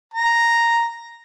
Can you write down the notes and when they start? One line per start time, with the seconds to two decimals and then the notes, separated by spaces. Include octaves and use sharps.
0.14 A#5